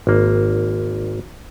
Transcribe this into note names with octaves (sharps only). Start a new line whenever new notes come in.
G#1 A#3